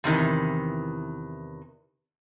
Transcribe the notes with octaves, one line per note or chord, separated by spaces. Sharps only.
E2 C3 D#3 E3